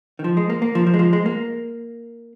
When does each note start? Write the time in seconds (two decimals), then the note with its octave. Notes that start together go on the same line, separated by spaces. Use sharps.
0.19 D#3
0.24 F3
0.37 G#3
0.50 A#3
0.62 A#3
0.75 F3
0.87 F3
0.94 G#3
0.99 F3
1.13 G#3
1.26 A#3